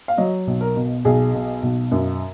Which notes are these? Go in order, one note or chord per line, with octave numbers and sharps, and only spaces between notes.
F5
F#3 D#5
B1
A#4
B2
B1 G#4
B2
B1
F#2